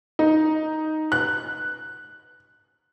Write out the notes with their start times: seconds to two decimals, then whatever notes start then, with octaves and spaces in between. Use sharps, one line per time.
0.19 D#4
1.12 F#6